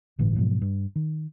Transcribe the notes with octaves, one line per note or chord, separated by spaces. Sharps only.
G1 A2 D3 E3
G#2 B2 F3 F#3
G2
D#3